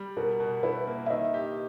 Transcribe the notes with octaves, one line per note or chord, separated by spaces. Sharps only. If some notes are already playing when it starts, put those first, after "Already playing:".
Already playing: G3
B2 A#4
B2
E4 B4
A#3
E5
D#3 D#5
G4